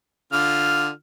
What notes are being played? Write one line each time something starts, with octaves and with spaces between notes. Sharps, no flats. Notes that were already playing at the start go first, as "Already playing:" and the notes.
D3 F4 F6